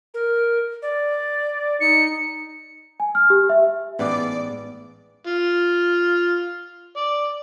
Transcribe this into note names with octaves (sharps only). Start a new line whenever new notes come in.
A#4
D5
D#4 C#7
G#5
F6
G4
E5
A1 G#2 B3 D5
F4
D5